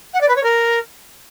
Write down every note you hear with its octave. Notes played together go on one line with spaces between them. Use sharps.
F#5
D5
B4
C#5
A#4